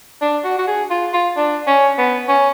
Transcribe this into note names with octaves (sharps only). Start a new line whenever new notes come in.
D4
F#4
F#4
G#4
F4
F4
D4
C#4
B3
C#4